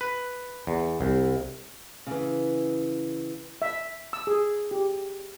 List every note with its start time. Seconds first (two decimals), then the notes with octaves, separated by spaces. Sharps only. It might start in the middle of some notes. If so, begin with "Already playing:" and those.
0.01 B4
0.67 E2
1.01 C2
2.07 C#3 E3
3.62 E5
4.13 E6
4.27 G#4
4.71 G4